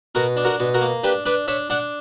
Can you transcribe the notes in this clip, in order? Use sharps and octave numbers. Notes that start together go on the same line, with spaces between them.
B2 F#4 A#4
D4
F#4 A#4
B2
F#4 A#4
A#3
D4 G4 B4
D4 B4 D5
D4 C#5 E5
D4 D5 F#5